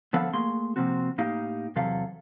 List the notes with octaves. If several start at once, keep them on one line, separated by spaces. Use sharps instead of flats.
D3 F3 B3 A4 F5 B5
A3 A#3 G#4 C6
C3 F3 A#3 C4 F#4
A2 A#3 D#4 G4 F5
E2 C3 F#3 A4 F5